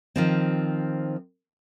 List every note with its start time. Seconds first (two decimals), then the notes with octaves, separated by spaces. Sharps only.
0.16 D#3 F3 C4